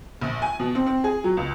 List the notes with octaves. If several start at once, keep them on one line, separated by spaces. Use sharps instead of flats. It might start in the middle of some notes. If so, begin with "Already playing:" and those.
A#1
G#5
B2
C4
C4
G#4
F#3
C#2